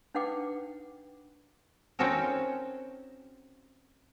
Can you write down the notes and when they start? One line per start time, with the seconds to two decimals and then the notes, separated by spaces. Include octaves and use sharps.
0.14 D4 D#4 B4 F#5 G5 D6
1.99 C4 C#4 D#4 F#4 A4 A#4